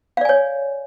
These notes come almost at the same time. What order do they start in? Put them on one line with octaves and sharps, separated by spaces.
F5 D5 G#5 C#5